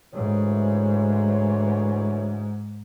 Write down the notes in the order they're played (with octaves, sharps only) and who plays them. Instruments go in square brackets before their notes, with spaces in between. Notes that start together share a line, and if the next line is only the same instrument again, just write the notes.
[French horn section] D2 E3 C#5 [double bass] G#2